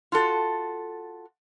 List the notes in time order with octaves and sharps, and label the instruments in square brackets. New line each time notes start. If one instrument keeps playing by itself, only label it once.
[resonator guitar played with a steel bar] F4 F#4 A4